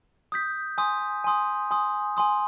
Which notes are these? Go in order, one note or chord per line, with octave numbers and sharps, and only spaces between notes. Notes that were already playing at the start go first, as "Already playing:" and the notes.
D#6 G6 B6
G#5 C6 D#6
G#5 C6 D#6
G#5 C6 D#6
G#5 C6 D#6